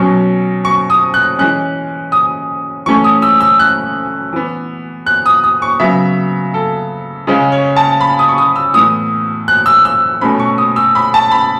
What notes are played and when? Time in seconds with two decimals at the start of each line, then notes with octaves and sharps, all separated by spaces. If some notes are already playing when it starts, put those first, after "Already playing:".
Already playing: B2 F#3 C#4 C#6
0.65 C#6
0.90 D#6
1.14 F#6
1.39 E3 G#3 C#4 F#6
2.12 D#6
2.86 E3 A3 C#4 C#6
3.04 D#6
3.22 E6
3.40 E6
3.59 F#6
4.33 E3 B3
5.06 F#6
5.26 D#6
5.44 D#6
5.62 C#6
5.80 C#3 F#3 B3 E5
6.54 A4
7.27 C#3 G#3 C#4
7.52 C#5
7.76 A5
8.01 B5
8.19 D#6
8.29 C#6
8.38 D#6
8.56 E6
8.74 A2 E3 B3 D#6
9.48 F#6
9.66 E6
9.85 E6
10.21 B2 A3 C#4 B5
10.40 C#6
10.58 D#6
10.76 E6
10.95 B5
11.14 A5
11.32 B5